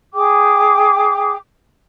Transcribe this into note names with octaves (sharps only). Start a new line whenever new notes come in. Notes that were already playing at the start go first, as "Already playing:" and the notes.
G#4 G5 D6